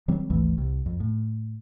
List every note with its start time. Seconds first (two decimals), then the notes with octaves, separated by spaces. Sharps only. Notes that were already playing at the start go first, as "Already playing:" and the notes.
0.08 D#3 F#3 G3 C4
0.30 G#1 D2 E3 A3
0.58 C2
0.86 F2
1.00 A2